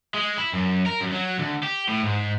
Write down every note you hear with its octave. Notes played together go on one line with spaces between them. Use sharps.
G#3
E4
F#2
A#4
F#2
F#3
D2
G4
A2
G#2